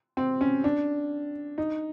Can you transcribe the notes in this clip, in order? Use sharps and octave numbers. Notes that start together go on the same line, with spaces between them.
C4
C#4
D4
D#4